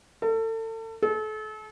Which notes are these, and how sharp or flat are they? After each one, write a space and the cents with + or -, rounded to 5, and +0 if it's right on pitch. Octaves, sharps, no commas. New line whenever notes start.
A4 +35
A4 -35